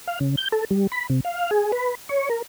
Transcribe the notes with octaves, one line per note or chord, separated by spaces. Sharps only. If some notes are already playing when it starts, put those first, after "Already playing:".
F5
C#3
G6
A4
G3
B5
C3
F5
G#4
B4
C#5
A#4